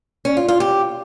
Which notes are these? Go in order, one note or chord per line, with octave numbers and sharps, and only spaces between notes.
C#4
F4
F4
G4